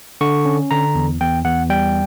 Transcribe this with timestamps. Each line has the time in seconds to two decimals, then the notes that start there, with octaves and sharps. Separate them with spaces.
0.21 D3 C#6
0.45 C#4
0.71 D3 A#5
0.95 E2
1.21 E2 G5
1.45 E2 F#5
1.70 G3 G5